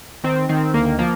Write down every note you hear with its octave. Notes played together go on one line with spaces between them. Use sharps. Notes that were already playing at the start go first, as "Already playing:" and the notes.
D#3 C4
D#3 C4
D2 A#3
F3 A#3